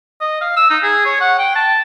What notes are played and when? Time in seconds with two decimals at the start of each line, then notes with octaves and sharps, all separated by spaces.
0.21 D#5
0.41 F5
0.57 E6
0.70 D#4
0.83 G#4
1.05 C#5
1.21 F#5
1.39 G5
1.55 A5